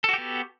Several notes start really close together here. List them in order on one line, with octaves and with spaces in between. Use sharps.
A4 F#4 G4 B3